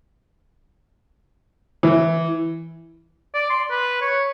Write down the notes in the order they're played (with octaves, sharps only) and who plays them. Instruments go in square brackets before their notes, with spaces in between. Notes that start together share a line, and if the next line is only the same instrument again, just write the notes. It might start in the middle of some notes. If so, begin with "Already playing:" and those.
[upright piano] E3
[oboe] D5
C6
B4
C#5